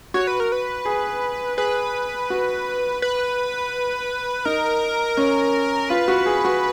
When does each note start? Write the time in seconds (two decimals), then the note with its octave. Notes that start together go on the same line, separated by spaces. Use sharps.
0.14 F#4 C#5
0.27 B4
0.40 A#4
0.52 B4
0.85 G#4
1.57 G#4 B4
2.30 F#4
3.02 B4
4.45 D#4 A#4
5.17 C#4
5.89 F4 B4
6.08 F#4
6.26 G#4
6.44 F#4